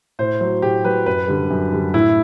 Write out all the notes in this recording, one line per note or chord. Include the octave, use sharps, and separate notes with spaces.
A2 C5
F#3 C5
A2 G4
F#3 B4
F#2 B4
D3 G3
F#2
D3 G3
A2 E4